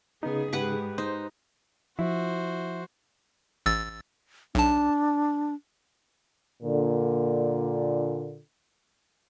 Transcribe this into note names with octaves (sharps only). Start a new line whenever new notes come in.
C#3 B3 D#4 G#4
G#2 G4 B4 F#5
D#4 C5
F3 E4 F#4 C5
A1 E6 A6
B1 D4 A5
A#2 D3